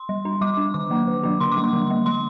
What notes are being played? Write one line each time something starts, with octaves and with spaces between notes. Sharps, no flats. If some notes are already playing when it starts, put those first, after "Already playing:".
Already playing: C6
G3
D4
G3 D6
D4
D#3 D6
F#3 A#3 D4
D#3
F#3 A#3 D4
D3 C6
D6
G3 A#3
C6
D3
G3 A#3
G3 C6